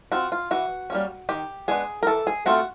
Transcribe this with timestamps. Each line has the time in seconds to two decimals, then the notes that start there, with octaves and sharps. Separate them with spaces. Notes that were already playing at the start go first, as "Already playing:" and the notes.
0.12 C4 F4 F#4
0.32 F4
0.51 E3 F#4
0.90 G3 A#3 C#4
1.29 D#3 G4
1.68 G#3 B3 D4 G#4
2.03 A#4
2.07 E3 A4
2.27 G#4
2.46 A3 C4 F4 F#4